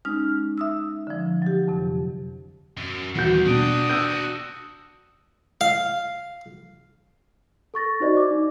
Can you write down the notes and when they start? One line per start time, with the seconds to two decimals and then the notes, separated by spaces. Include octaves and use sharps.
0.05 G#3 C#4 D#4 F6
0.58 E5 D#6 E6
1.07 D3 F3
1.42 F#3 G4
1.68 F2 C3
2.77 F#2
3.15 D#1 E2 F#4 G6
3.46 B2 D4 F#4 G5 D#6
3.89 E6 F#6 G6
5.61 F5
7.74 A4 C#6 A6 A#6
8.00 D#4 F#4 C5 D5 D#5
8.16 D5 D6
8.31 D#4